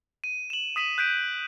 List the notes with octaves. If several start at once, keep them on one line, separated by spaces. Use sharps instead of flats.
D#7
E7 F#7
D#6 B6 D#7 E7 F#7
F#6 G6 B6 D7 D#7